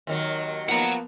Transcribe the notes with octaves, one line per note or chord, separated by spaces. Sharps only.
D#2 D#3 F#3
F3 A#3 B3 F#5 A#5